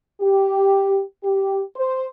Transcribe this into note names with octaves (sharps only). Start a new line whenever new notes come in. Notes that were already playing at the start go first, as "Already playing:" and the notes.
G4
G4
C5